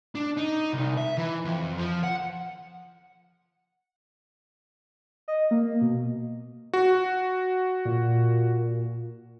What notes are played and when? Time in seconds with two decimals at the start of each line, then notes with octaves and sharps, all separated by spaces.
0.15 D4
0.37 D#4
0.73 C2
0.97 E5
1.18 E3
1.45 F2
1.78 F3
2.04 F#5
5.28 D#5
5.51 A#3
5.81 B2
6.73 F#4
7.85 A#2